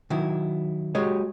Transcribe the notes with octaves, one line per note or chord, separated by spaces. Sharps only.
D#3 F#3 E4
G#3 F#4 G4 C#5 D#5